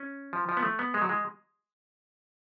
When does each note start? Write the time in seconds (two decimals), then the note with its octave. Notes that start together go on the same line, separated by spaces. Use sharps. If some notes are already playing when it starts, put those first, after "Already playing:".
Already playing: C#4
0.33 F3
0.49 F3
0.57 B3
0.63 A3
0.79 B3
0.94 G#3
1.02 F#3
1.09 G#3